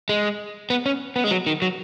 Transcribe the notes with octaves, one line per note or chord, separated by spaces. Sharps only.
G#3
B3
C#4
B3
G#3
F#3
D#3
F#3